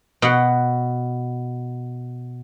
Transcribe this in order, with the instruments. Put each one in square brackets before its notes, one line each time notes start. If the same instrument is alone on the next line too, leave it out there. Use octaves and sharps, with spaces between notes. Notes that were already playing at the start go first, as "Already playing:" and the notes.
[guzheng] B2 F#5